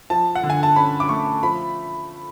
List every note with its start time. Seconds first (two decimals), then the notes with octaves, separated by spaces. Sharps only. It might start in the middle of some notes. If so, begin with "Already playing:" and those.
0.10 F3 A5
0.35 F#5
0.43 D3
0.50 G#5
0.63 A5
0.76 C#4 B5
1.00 D6
1.09 A3 C#6
1.43 F3 B5